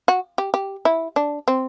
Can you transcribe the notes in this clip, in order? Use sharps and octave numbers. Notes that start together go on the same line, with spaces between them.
F#4
G4
G4
E4
D4
C4